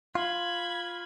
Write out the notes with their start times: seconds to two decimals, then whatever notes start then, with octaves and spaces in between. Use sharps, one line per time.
0.15 F4 B5 G#6